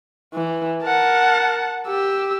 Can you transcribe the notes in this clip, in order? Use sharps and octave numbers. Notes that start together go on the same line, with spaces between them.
E3
A#4 F#5 A5
G4 E6